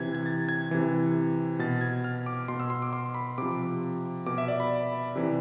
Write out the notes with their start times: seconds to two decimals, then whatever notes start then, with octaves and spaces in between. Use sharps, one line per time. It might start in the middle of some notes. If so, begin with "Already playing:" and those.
Already playing: C3 E3 G#6
0.15 G#6
0.26 A6
0.49 G#6
0.71 C3 E3
1.59 B2 A6
1.81 G#6
2.04 F6
2.26 D6
2.48 B2 C6
2.60 E6
2.70 C6
2.82 D6
2.93 C6
3.14 B5
3.38 C3 F3 D6
4.26 B2 D6
4.38 E5
4.48 D5
4.60 B5
5.16 C3 E3